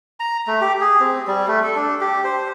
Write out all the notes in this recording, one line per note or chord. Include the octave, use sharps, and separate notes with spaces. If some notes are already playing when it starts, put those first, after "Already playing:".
A#5
A3
G4
G#4
C4
G3
A3
A4
D4
G4
C5